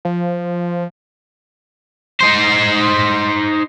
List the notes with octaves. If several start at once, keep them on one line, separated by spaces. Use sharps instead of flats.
F3
D#4 C5